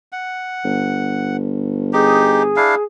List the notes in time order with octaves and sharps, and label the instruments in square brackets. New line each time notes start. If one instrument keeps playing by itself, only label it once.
[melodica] F#5
[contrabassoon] G1
[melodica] D#4 G4 [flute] G#4
[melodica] D4 E4 F5